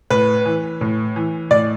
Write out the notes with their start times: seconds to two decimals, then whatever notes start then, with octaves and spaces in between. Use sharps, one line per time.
0.10 A2 B4
0.46 E3
0.81 A2
1.16 E3
1.51 A2 D5